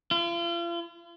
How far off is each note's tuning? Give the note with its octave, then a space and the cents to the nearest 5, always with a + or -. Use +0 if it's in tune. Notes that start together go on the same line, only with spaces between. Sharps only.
F4 -40